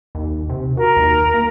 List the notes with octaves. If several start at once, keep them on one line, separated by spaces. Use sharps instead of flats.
D#2
C3
F#4 A#4
D#2
A#3